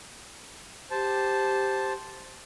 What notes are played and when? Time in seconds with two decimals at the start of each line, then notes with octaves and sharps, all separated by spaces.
0.91 G4 C5 A5